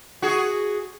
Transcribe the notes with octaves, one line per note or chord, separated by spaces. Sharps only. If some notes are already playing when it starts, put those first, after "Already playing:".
F#4 G#4